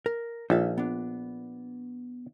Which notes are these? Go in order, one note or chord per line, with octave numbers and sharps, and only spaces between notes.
A#4
A#1 D#4 E5 F5
B3 D4